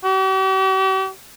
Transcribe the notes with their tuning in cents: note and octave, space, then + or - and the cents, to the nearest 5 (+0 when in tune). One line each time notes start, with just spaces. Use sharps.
G4 -45